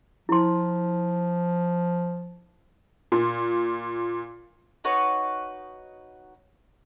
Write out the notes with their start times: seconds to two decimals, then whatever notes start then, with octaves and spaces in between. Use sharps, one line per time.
0.29 F3 E4 C6
3.12 A#2
4.84 D#4 F#4 B4 C#5